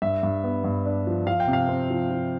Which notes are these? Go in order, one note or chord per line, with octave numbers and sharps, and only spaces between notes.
G2 E5
G2
B3
G2
D4
F3
F3 F5
G5
C3
F5
C4
F3
F3